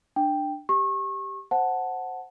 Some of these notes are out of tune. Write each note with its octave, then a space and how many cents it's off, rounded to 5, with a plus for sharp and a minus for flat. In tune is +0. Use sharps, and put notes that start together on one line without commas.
D4 +20 G5 +0
G4 +0 C#6 -30
C5 +0 F#5 +0 A5 +0